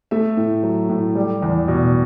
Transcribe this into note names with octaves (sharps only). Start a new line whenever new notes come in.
A3 E5
A2
F#3
A2
G3
E2
B2